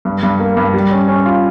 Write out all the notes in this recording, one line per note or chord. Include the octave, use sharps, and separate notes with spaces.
G2
G2
A#3
G2
G3
C#4
C#4
F4